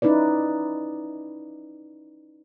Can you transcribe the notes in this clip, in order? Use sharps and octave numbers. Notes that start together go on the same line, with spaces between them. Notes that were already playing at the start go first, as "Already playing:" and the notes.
C#4 D#4 E4 B4 D5